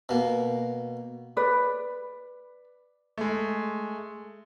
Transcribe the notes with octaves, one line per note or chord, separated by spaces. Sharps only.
B2 A#3
B4 D5
G#3 A3